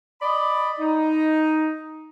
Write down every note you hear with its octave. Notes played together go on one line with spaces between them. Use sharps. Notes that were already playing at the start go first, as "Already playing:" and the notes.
D5 D#5 B5
D#4